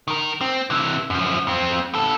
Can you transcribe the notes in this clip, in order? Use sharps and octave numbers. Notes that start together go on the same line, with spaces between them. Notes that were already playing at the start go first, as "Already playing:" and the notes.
D#3 A#4
C4
C3 E3
F#2 F3
F2 C4
B3 A4